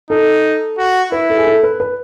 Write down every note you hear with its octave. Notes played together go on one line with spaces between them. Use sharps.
D#4 A4
F#4
E4 B4
A4
G#4
A4
B4
B4